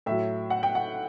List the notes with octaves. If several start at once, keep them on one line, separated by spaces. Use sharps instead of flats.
A2 F#3 E5
F#5
G5
F#5